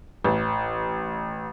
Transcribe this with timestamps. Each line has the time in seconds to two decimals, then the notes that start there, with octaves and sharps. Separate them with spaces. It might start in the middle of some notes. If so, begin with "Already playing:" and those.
0.25 A1